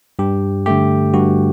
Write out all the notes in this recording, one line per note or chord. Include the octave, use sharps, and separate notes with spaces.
G2 G4
D3 A3 G4
G2 F#4